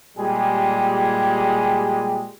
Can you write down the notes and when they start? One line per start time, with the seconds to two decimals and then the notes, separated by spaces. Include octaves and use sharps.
0.18 A#2 G3 G#3 G4 G#4